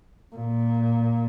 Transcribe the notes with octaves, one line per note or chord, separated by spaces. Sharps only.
A#2